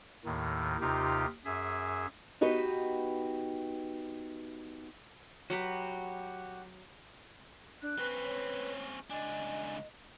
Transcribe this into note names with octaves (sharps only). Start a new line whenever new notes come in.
D#2 A2 D#3
D#2 C3 D#4 F4 G4
F#2 G#4 E5
B3 D#4 F#4 G4 B4
F#3 F#4 G4 B4
D4 F#6
C4 C#4 B4
C#5
C#2 D4 D#5 G#5